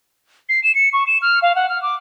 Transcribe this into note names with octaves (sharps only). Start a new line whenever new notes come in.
C7
E7
C#7
C#6
E7
F6
F5
F#5
F6
D6